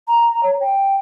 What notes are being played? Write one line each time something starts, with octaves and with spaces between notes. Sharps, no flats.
A#5
C#5
G5